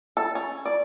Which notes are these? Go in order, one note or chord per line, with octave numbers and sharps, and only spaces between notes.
A4
C#4
D5